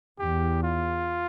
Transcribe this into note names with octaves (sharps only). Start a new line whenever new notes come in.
E2 G4
F4